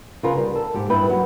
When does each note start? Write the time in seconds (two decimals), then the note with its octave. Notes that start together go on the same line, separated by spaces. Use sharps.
0.23 C#3 F4 A#4 B4
0.37 G3
0.55 A4
0.74 G#2 G4
0.90 G2 E4 B4 G5
1.09 F#3